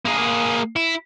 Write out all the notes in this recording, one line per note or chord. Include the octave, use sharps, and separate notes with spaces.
A#3 G#4
E4